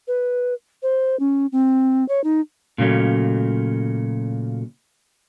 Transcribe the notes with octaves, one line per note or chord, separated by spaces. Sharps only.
B4
C5
C#4
C4
C#5
D#4
A#2 C#3 F#3 A3